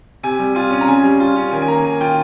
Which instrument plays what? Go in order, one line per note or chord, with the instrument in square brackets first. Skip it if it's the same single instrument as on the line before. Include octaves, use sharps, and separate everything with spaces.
[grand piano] C3 G#5
G3
F4 G#5
C#4
A#5
C#3 G#5
G3
F4
C#4
D#3 G#5
G#5
A#3 A#5
D#3 G#5
F4 G5